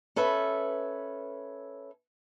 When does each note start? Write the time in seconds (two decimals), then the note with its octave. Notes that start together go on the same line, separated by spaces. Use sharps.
0.16 C#4 A4 B4 E5